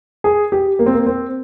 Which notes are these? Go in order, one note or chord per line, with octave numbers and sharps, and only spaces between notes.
G#4
G4
A#3
C4
A#3
C4